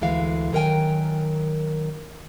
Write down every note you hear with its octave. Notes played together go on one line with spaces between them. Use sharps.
D2 E3 G#3 F5
D#3 F#3 A#4 C5 G5 G#5